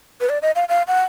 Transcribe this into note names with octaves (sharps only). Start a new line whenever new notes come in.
B4
D5
D#5
F5
F5
F#5